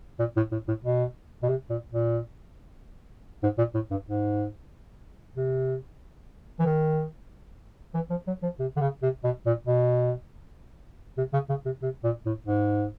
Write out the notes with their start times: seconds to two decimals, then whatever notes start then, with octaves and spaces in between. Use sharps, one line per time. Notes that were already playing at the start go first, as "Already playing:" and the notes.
0.19 A#2
0.36 A2
0.52 A2
0.68 A2
0.85 B2
1.43 B2
1.49 C3
1.70 A#2
1.93 A#2
3.43 G#2
3.58 A#2
3.74 A2
3.91 G2
4.07 G#2
5.37 C3
6.60 E3
6.66 D#3
7.95 E3
8.10 F3
8.27 F#3
8.43 F3
8.60 C3
8.77 D3
8.81 C#3
9.03 C3
9.24 B2
9.46 A#2
9.67 B2
11.18 C3
11.34 C#3
11.49 C#3
11.66 C3
11.82 C3
12.04 A#2
12.26 A2
12.47 G#2